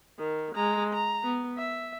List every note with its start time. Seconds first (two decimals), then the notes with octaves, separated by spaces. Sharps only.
0.19 D#3
0.56 G#3 A#5
0.94 A#5
1.24 B3
1.58 E5